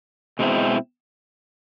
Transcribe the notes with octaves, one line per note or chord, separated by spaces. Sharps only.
B2 G#3 C4 E4